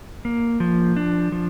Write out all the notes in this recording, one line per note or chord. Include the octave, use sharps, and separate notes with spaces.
A#3
F3
D4
F3